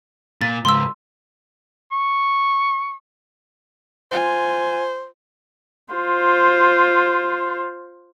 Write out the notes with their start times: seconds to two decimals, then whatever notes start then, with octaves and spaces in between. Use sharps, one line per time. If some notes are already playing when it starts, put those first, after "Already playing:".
0.41 A#2 A6
0.65 C#2 G#2 C6 E6
1.92 C#6
4.11 F4 C5 G#5
5.93 F4 C5